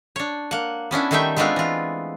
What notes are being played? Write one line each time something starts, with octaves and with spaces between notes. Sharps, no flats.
D4 C#5
A#3 F#5
B3 C#4 D4 E4
D#3 G3 A3 D#4 E5 G5
G#3 A3 B3 C4 D4 F4
E3 F4